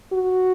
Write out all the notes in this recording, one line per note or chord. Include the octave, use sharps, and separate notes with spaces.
F#4